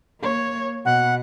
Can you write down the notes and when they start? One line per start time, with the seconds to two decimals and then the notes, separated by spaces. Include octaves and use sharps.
0.20 A#3 C#5
0.85 B2 F#5